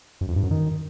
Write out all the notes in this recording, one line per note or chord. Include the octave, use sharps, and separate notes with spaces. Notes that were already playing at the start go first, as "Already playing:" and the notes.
F#2
F2
G2
F#2
D#3